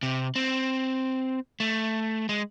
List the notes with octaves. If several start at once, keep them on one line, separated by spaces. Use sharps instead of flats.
C3
C4
A3
G#3